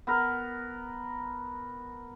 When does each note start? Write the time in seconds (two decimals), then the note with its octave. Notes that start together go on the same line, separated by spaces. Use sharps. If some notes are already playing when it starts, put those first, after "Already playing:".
0.07 B3 A#4